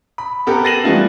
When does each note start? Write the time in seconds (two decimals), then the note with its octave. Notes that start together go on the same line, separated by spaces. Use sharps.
0.18 B5
0.47 B3 G4 A4 A#4
0.65 A6 A#6 C7 D#7 E7 F#7
0.84 E3 G3 A3 B3 E4 F4